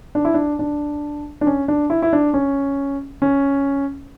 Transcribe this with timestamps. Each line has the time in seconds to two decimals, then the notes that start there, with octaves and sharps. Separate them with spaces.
0.15 D4
0.25 E4
0.34 D4
0.59 D4
1.41 D4
1.47 C#4
1.68 D4
1.90 E4
2.02 E4
2.13 D4
2.34 C#4
3.22 C#4